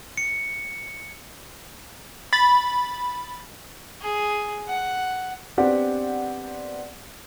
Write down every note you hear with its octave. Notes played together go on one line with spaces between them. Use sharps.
C#7
B5 A6
G#4
F#5
B3 C4 D4 G4 D5 F#5